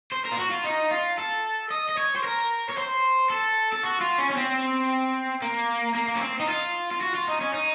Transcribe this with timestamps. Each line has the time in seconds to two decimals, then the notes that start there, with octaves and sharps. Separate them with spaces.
0.12 C5
0.25 A#4
0.31 F4
0.38 F#4
0.51 F4
0.65 D#4
0.91 F4
1.18 A4
1.71 D#5
1.89 D#5
1.97 C#5
2.16 C5
2.24 A#4
2.69 C#5
2.77 C5
3.30 A4
3.72 A4
3.83 F#4
4.00 F4
4.18 C#4
4.30 C#4
4.36 C4
5.42 A#3
5.95 A#3
6.08 A#3
6.15 C#4
6.22 C4
6.40 D#4
6.48 F4
6.91 F4
7.01 F#4
7.15 F4
7.28 D#4
7.41 C#4
7.54 D#4